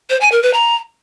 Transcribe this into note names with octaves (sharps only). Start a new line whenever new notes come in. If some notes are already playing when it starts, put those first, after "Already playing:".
C5
G#5
A#4
B4
A#5